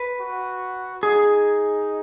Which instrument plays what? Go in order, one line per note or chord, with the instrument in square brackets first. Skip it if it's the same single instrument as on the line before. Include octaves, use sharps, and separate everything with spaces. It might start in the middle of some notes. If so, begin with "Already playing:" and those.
Already playing: [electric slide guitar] B4
[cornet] F#4
[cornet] D#4 [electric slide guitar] G#4